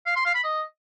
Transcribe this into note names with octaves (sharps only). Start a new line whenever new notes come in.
F5
C6
F5
B5
D#5